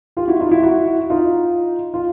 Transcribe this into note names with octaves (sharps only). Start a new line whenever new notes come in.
F4 G4
E4 F#4
D#4 F4
E4 F#4
E4 F#4
D#4 F4
F4